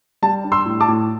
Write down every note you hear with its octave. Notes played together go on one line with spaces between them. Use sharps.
G3 A5
D4
C6 E6
A2
A5 D6
A2